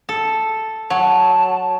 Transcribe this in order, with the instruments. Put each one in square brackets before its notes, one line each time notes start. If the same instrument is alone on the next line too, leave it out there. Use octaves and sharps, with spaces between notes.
[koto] A4
[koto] F#3 [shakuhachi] A5